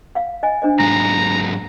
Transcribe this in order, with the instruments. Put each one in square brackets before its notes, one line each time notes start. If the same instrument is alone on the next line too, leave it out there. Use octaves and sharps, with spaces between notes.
[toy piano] F5 F#5
D#5 G#5
D4 C5 D#5
[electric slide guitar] G#2 F#3 G#3 [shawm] A#5